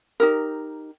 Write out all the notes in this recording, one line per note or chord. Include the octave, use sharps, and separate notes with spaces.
D#4 G4 A#4